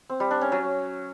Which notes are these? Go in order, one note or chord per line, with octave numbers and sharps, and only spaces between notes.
C4
G3
D4
C#4
F#3